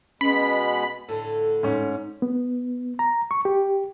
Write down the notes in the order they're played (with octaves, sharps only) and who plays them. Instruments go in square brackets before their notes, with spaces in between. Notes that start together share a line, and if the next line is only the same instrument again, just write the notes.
[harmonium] B2 G#3 B3 [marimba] C#4 [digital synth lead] B5
[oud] A2 D3 [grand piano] A4
[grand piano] G#2 C#4
[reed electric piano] B3
A#5
C#6
G4